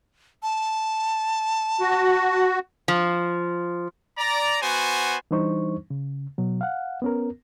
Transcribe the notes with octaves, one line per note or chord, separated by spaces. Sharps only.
A5
F#4
F3
D5 A#5
B3 F#4 C5 G#5
E3 G3 D4 D#4 C5 C#6
C#3
B2 F#3
F5 F#5
B3 C#4 A#4